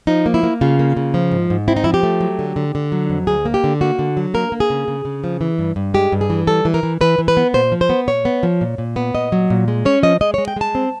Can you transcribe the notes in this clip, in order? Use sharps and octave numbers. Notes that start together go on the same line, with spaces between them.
F3 D#4
A#3
E4
A#3
C#3 F4
A#3
C#3
F3
G#2
G#2
C4 E4
D#4
F3 E4
G4
A3
F#3
D3
D3
D3
F#3
F2
D2 G#4
A#3
G4
D3
A#3 F#4
D3
F#3
A#3 A#4
A#3
G#4
C#3
C#3
C#3
F3
E3
G2
G2
G#3 G4
G2
G#4
E3
G3 A4
E3
A#4
E3
E3 B4
E3
B4
B3
A#2 C5
F3
C5
B3
A#2 C#5
B3
F3
A#2
A#2
B3
A#2 D#5
F#3
A#2
G#3
C#4 C#5
F3 D#5
G#3 D#5
G#3 C#5
G5
G#3 A5
C4